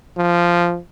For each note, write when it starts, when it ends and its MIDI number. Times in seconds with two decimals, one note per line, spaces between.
0.17 0.78 53